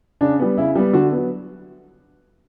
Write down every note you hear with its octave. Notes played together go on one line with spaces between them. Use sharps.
C#3 D4
G3 B3
C#3 E4
G3 B3
D3 F#4
F#3 B3